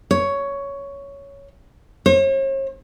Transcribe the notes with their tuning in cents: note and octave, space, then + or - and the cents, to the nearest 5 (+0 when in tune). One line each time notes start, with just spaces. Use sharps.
C#5 +10
C#5 -45